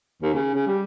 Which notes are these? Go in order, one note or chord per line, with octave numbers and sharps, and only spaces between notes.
D#2
C#3
C#3
G3